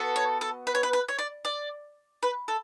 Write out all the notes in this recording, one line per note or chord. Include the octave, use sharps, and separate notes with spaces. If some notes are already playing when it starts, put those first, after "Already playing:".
Already playing: B3 F#4 A4
C#5
A4
B4
C#5
B4
B4
C#5
D5
D5
B4
A4